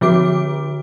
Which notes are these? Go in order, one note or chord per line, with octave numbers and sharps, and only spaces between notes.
D3 F3 F#4 D6 D7